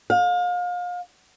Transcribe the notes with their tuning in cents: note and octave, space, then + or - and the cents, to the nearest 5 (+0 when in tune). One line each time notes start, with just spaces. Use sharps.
F5 +35